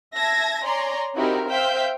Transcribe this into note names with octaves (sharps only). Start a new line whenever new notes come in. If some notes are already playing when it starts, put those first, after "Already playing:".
E5 A5 G#6 A#6
C#5 D5 G#5 A#5 C6
C4 D#4 E4 F#4 G4 A#4
C5 E5 F5 G5 G6 B6